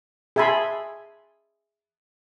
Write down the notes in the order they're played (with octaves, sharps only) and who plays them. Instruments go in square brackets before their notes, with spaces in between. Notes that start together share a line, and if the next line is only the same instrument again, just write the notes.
[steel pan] G#4 E5 G#5 A5 B5 C6